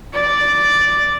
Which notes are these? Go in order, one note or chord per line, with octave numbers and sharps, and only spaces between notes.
D5